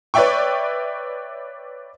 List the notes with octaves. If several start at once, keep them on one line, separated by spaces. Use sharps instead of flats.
B4 C#5 D5 E5 G5 C#6